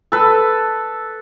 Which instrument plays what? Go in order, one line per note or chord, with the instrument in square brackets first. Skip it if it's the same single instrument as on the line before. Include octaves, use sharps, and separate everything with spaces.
[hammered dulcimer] A4 B4